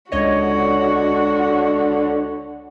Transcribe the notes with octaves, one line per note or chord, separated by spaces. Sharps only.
C#2 D3 F#4 C#5 D#5